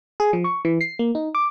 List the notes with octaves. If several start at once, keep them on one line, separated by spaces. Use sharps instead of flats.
G#4
F3
C#6
E3
C7
A#3
D#4
D6